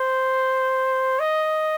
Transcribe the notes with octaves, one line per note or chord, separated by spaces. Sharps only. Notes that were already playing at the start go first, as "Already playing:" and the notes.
Already playing: C5
D#5